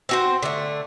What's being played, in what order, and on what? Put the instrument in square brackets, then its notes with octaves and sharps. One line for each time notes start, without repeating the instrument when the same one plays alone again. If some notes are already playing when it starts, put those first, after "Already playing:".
[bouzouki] C4 F#4 C5
D3 A3